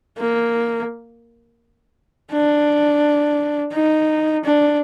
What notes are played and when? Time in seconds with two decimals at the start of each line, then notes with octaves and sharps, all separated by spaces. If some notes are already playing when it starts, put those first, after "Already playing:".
0.18 A#3
2.32 D4
3.73 D#4
4.44 D4